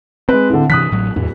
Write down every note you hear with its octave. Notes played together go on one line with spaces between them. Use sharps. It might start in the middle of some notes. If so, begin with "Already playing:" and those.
G#3 C4 B4
A2 D3
G2 C3 E3 D#6 F#6 B6
A1 A2 F#3
D1 E2